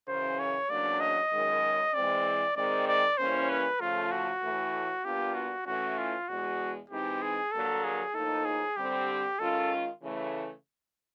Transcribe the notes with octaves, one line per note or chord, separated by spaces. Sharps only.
F#2 C#3 E3 C5
C#5
E2 C#3 F#3 A#3 D4 D5
D#5
F#2 D#3 G#3
E3 G#3 C4 D5
D#3 G#3 C4 D5
D5
E3 G3 A#3 C#4 E4 C5
B4
C#3 F3 A3 F4
F#4
A2 E3 A3
A#2 G3 B3 D4 F4 G4
F#4
E3 A3 C#4 F#4
F4
E2 B2 G#3 F#4
E3 G#3 C4 D#4 G4
G#4
G2 D3 F#3 A#3 A4
G#4
A2 F3 A#3 D#4 A4
G#4
D3 G3 C4 G4
D#3 G#3 C#4 F4 A4
C#3 E3 A3